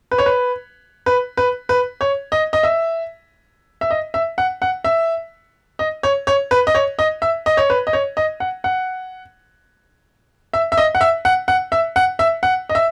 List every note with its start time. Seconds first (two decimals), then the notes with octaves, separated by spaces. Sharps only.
0.11 B4
0.18 C#5
0.26 B4
1.06 B4
1.37 B4
1.69 B4
2.01 C#5
2.32 D#5
2.53 D#5
2.63 E5
3.81 E5
3.90 D#5
4.14 E5
4.38 F#5
4.62 F#5
4.84 E5
5.79 D#5
6.03 C#5
6.27 C#5
6.51 B4
6.67 D#5
6.75 C#5
6.99 D#5
7.22 E5
7.46 D#5
7.57 C#5
7.70 B4
7.87 D#5
7.93 C#5
8.17 D#5
8.40 F#5
8.64 F#5
10.53 E5
10.72 E5
10.77 D#5
10.95 F#5
11.01 E5
11.25 F#5
11.48 F#5
11.72 E5
11.96 F#5
12.19 E5
12.43 F#5
12.69 D#5
12.75 E5